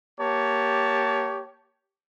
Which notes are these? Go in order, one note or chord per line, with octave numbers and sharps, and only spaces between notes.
A#3 G4 C#5 A5